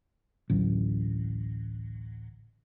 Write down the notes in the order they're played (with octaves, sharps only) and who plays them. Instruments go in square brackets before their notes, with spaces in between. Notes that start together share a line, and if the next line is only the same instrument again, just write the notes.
[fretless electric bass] A1 D2 F#3